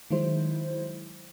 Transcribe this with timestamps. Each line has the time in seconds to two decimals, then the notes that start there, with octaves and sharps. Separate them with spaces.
0.11 D#3 F#3 G#3 E4 C5